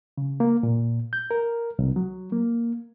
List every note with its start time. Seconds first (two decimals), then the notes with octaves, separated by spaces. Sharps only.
0.18 C#3
0.40 A#3
0.63 A#2
1.13 G6
1.31 A#4
1.79 C2
1.96 F#3
2.32 A#3